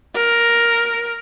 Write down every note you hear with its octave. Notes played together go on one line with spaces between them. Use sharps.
A#4